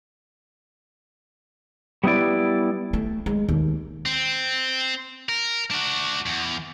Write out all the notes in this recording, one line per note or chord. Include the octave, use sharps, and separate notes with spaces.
G3 B3 D#4 E4 D5
A3
G#3
D#2
C4
A#4
D4 F#4
E2